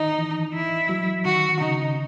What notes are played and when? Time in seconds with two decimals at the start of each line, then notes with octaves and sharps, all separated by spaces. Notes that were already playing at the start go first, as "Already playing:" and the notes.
Already playing: D#3 D#4
0.19 E3
0.54 E4
0.89 F#3
1.25 D#3 F#4
1.61 C#3 D#4